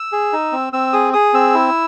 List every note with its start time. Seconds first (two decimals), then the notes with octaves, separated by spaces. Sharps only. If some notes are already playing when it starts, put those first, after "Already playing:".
Already playing: E6
0.12 G#4
0.33 D#4
0.52 C4
0.73 C4 E6
0.93 G#4 D#6
1.13 G#4 D#6
1.33 C4 E6
1.54 E4